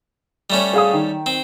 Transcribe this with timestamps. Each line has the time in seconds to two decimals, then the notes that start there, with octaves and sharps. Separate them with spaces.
0.50 G3 A3 C#4
0.73 G#4 F5 D#6
0.93 D#3
1.26 C4